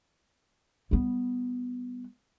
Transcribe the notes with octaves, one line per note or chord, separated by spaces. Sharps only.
G3 B3